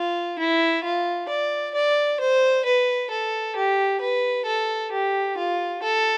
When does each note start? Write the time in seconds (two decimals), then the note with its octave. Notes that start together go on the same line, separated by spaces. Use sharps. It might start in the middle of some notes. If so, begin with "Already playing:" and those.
Already playing: F4
0.39 E4
0.84 F4
1.29 D5
1.75 D5
2.20 C5
2.65 B4
3.11 A4
3.56 G4
4.01 B4
4.46 A4
4.92 G4
5.38 F4
5.83 A4